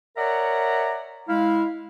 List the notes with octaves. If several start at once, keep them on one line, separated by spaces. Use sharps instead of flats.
A#4 C#5 D5 E5 F#5 A#5
G#3 E4 F5